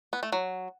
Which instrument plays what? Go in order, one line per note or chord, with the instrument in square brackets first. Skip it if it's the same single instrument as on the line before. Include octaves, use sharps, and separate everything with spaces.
[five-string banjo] B3
A3
F#3